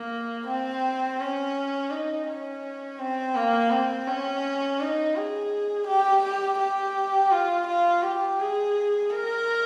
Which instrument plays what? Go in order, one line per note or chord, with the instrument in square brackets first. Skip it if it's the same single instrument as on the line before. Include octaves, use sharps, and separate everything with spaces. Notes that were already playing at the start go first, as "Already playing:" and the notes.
Already playing: [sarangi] A#3
C4
C#4
D#4
C#4
C4
A#3
C4
C#4
D#4
G#4
G4
G4
G4
F4
F4
G4
G#4
A#4